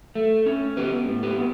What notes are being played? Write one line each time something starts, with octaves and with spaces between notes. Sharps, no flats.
A3
C#4
B3 G4 B4
A2
G4 B4
B3